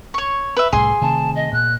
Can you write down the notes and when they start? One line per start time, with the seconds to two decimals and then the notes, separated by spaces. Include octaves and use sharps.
0.14 C#5 C#6
0.57 B4 E5
0.73 C2 A2 G3 G#4 C6
1.01 C3 D#3 A3 A5
1.35 D#5
1.52 A#2 F#6